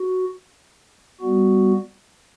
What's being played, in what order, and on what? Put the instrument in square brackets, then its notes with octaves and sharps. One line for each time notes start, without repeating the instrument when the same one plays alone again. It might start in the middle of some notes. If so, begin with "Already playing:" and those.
Already playing: [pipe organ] F#4
G3 B3 F#4